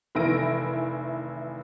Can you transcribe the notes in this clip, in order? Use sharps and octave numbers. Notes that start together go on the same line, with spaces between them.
F1 D#3 E3 E4 A#6 D7